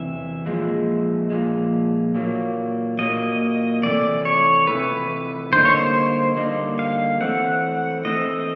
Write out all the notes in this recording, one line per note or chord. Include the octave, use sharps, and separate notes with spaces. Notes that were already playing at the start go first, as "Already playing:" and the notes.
Already playing: E2 C3 E3 E5
A#2 F3 G#3
A#2 F3 G#3
A#2 F#3 A#3
A#2 F#3 A#3 D#5
C3 E3 A3 D5
C#5
C3 E3 A3 B4
D3 G3 A#3 D#4 C5
C#5
C5
D3 G3 A#3 D#4
F5
E3 A3 C4 F#5
E3 A3 C4 D#5